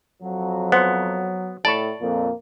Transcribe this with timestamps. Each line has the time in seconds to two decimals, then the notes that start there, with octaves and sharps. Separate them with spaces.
0.22 F2 F#3
0.72 B3 C5 F#5
1.65 A2 D5 A5 B5 C#6
2.01 F2 A#2 A#3